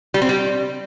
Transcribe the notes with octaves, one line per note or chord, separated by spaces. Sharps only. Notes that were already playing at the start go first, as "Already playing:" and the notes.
G3
C4
G3